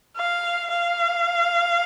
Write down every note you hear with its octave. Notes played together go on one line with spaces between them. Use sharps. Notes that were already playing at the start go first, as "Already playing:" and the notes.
F5
F5